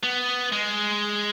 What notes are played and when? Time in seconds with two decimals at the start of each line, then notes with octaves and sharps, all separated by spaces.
0.03 B3
0.52 G#3